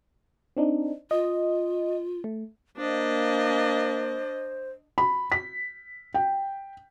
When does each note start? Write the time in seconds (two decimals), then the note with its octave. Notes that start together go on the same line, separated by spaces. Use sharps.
0.57 C4 D4 D#4
1.11 F4 D#5
2.24 A3
2.78 A#3 D4 C5 D#5
4.98 B5
5.32 B6
6.14 G5